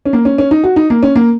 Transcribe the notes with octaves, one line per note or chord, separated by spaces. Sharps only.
C#4
A#3
C#4
C#4
D#4
F#4
D#4
A#3
C#4
A#3